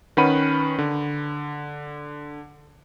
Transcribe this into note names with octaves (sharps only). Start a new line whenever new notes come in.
D#3 C#4 B4 F#5 B5 D#7
D3